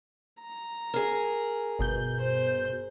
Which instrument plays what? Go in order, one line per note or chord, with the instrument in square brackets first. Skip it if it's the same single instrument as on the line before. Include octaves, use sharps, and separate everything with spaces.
[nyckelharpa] A#5
[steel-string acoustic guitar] G#4 A#4
[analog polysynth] G1 B2 G6
[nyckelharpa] C5